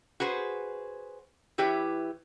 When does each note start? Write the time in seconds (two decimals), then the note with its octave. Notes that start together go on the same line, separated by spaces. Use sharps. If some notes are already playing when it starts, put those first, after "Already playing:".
0.20 F#4 G#4 B4 C5
1.58 E3 E4 G4 B4 C#5